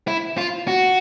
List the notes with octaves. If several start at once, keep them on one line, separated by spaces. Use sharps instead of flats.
E4
F4
F#4